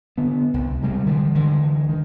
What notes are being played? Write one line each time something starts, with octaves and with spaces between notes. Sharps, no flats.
D3 B3
C2
C3 G3 G#3
D3 E3 F3 G3
D2 D3 E3 G#3
D#3